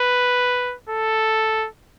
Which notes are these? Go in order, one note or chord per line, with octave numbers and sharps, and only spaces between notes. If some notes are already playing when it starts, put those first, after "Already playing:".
Already playing: B4
A4